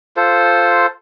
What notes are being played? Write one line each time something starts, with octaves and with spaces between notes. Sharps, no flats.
F4 A4 C5